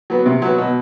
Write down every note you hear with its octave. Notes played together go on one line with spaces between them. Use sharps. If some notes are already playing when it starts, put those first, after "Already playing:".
F#3 B3
C3
F#3 B3
B2